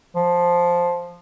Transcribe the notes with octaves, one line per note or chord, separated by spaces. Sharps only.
F3